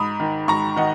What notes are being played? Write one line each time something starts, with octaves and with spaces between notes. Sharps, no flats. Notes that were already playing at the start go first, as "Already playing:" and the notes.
Already playing: G#2 B5 D#6
D#3
G#2 A#5 C#6
D#3 D#5 F#5